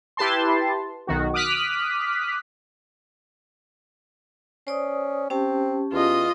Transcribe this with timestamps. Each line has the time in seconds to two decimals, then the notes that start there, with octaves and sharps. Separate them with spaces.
0.17 E4 G4 B4 A5 C6
1.07 B1 D#3 F#4
1.34 D6 D#6 F6 F#6 B6
4.67 C#4 C5 D5 D#6
5.30 C4 C#4 G4 A5
5.92 E2 F4 D#5